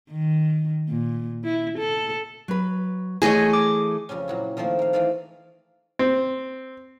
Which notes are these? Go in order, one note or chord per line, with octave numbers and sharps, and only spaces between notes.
D#3
A#2
E4
A4
F#3 B4
E3 A3 G#4 C#5 D#5 G#5
D6
F2 C#3 G3 C#4
A#2 F#3 E4
D#3 F3 A3 A#3 C4
A#3 F5
E3 G#3 A3 D5 F5
C4